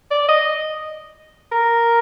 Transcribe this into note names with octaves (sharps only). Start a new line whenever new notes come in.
D5
D#5
A#4